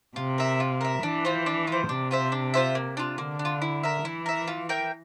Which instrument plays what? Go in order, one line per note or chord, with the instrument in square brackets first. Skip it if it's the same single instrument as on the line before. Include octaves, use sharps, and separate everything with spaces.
[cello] C3 [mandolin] F4
[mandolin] A#4 E5
F4
A#4 E5
[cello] E3 [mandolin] D4
[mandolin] F4 C5
D4
F4 C5
[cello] C3 [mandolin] D4
[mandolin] F4 C5 E5
D4
F4 C5 E5
A#3
D4 F4
[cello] D3 [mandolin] A#3
[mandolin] D4
F4
E4
A#4 E5
[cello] E3 [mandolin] E4
[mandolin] A#4 E5
F4
A#4 E5 G5